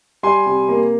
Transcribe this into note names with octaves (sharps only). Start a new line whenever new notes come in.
G3 G#5 C6
C3
A#3